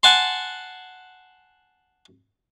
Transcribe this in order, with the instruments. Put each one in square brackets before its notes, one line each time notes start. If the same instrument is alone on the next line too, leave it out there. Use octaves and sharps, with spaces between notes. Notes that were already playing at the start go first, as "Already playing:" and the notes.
[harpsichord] F#5 G#5 A5 C6